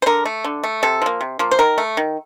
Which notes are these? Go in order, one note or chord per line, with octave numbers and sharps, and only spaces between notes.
C5
D3 A#4
A3
D3
A3
C3 A4
F3 A#3
C3
F3 A#3
C5
D#3 A#4
A3
D#3